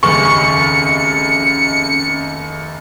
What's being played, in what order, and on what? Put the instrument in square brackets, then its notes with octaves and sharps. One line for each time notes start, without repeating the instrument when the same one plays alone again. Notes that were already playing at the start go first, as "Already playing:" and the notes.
[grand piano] F1 D#2 [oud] C#3 [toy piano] C#6 [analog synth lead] C#7